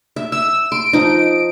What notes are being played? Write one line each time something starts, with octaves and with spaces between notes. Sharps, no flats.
E5
E5 E6
C6 D7
F3 D#4